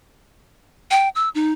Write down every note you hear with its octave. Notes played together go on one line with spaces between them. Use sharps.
G5
E6
D#4